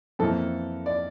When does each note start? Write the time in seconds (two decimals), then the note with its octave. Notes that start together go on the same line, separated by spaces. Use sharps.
0.19 F2 E3 A#3 A4
0.86 D5